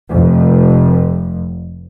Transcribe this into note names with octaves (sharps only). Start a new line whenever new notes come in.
F1 F2